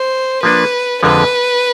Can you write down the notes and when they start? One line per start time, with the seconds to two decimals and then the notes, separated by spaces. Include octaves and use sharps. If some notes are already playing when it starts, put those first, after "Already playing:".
Already playing: C5
0.43 F3 A#3 D4 B4
1.03 F2 D3 F3 G#3 B4